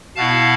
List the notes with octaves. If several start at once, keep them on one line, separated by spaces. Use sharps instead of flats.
B2 B3 E4 F5 A5